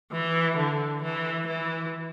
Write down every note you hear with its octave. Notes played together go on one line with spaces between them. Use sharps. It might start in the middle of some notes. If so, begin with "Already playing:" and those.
E3
D3
E3
E3